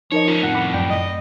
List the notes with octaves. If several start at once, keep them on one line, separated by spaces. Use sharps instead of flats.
F3 D#4 A#4 C#5 D#5
C#4 D#4 F4
F2 A2 F#5
B5 D6
F#2 D5 G5 B5
D#5